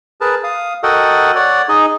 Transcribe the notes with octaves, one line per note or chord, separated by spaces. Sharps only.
G#4 A#4 B4 A5
F5 D#6
F#4 A4 A#4 D#5 F#5 G5
C#5 D5 F#5
D#4 G#4 D#5